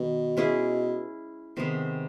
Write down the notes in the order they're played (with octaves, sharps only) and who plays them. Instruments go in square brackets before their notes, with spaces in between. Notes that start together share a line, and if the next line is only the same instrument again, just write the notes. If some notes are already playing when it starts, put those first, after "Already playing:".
Already playing: [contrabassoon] B2 [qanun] D#3
[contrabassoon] B2 [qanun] G#3 C#4 E4 G#4
[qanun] C3 D#3 G#3 B3